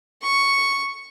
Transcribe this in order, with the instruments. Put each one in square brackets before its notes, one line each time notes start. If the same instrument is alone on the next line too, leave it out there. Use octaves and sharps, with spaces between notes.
[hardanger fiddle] C#6